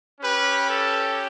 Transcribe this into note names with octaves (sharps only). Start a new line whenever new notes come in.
C#4 G4 B4
A4